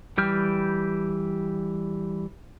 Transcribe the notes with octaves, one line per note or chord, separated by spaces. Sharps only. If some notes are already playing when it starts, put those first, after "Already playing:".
E3 G3 G5 F6